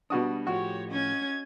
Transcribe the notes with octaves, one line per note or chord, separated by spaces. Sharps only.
B2 G3 D4 F#4 D#6
A2 F3 F#4 G4 C#5
C#4 D#5 G#6